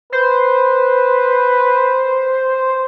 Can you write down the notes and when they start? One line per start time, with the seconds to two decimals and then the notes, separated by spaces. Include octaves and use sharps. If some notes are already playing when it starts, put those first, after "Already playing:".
0.12 B4 C5